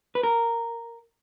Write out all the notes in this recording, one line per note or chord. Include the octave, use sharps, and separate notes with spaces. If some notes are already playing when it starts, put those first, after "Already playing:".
B4
A#4